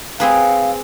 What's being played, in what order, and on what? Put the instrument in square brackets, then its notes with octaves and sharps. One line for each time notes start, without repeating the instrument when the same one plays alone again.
[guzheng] C4 G#4 B4 [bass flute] F5